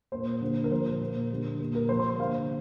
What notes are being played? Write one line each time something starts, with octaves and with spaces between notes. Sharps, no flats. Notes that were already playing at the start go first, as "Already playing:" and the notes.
A#2 A#3 C5
D3 G3 A#3
A#4
A#2 F3 A#3 C5
A#2 A#3
D3 G3 A#3
A#2 A#3
A#4
C3 F3 A#3 C5
C6
C6
D3 G3 A#3 F5